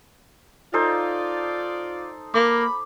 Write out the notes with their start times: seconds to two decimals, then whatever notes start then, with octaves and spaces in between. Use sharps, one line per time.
0.74 D#4 F4 A4 C5 D5
2.34 A#3 B5 D6